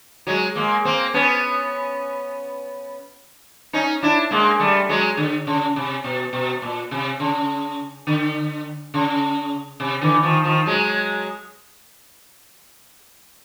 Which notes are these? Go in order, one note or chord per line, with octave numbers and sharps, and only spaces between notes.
F#3 G#3
G#3 A#3
A#3 C4
B3 C#4
C#4 D#4
D4 E4
G#3 A#3
G3 A3
F#3 G#3
D3
C#3
C3
B2
B2
A#2
C3
C#3
D3
C#3
C3
D3 E3
D#3 F3
D#3 F3
F#3 G#3